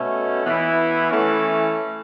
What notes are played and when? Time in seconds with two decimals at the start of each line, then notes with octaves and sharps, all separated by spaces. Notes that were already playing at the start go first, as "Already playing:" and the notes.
Already playing: B2 A3 C#4
0.45 E3 B3 E4
1.09 E3 A3 C#4